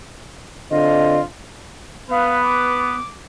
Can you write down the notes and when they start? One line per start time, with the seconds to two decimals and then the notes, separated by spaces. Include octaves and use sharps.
0.71 D3 C4 F4 D#5
2.10 B3 B4 F5
2.45 D6